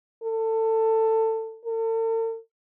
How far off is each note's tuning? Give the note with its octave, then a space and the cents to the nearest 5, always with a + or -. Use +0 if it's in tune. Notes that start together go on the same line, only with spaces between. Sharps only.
A4 +20
A4 +45